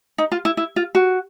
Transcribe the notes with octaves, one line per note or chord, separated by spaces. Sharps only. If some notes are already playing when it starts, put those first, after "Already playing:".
D#4
F4
E4
E4
F4
F#4